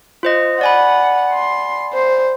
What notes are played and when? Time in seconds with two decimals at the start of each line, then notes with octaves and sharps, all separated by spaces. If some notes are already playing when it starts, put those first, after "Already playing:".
0.23 F4 C5 D#5
0.61 D5 F#5 G#5 B5
1.33 C6
1.94 C5